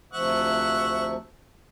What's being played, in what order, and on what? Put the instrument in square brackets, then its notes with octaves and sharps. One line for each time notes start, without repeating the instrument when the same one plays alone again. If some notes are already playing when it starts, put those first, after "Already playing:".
[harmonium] D2 C3 F3 [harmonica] E5 F#5 C#6